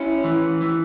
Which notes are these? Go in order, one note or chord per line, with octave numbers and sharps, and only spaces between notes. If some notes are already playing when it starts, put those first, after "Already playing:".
Already playing: C#4 E4
E3
E3